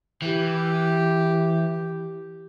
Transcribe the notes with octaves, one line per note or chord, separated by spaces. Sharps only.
E3 G4